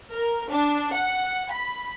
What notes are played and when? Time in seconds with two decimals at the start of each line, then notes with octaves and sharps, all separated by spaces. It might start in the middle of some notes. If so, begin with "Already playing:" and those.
0.13 A#4
0.49 D4
0.93 F#5
1.51 B5